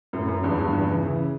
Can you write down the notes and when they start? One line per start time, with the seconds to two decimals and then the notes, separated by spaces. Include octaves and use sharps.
0.13 F#2 A2
0.28 F#2
0.43 E2 G2
0.57 E2 G2
0.73 E2 G2
0.87 C#3 E3
1.03 C#3 E3